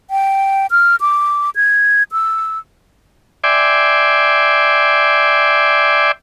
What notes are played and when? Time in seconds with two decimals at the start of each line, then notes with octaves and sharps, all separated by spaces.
0.10 G5
0.71 F6
1.01 D6
1.56 G#6
2.12 E6
3.44 D5 E5 G5 G#5 C6 D6